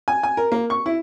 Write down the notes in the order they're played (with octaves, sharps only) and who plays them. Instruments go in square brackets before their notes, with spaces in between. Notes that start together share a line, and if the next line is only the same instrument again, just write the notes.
[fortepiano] G#5
G#5
A#4
A#3
C#6
E4